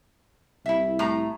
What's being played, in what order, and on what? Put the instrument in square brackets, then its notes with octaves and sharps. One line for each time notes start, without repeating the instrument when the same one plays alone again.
[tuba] C2 [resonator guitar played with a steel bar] E4 E5
[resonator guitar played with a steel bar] A2 A#5